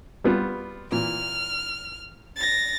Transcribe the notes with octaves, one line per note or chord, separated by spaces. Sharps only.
G3 B3 F4
A#2 E3 F6
A6 A#6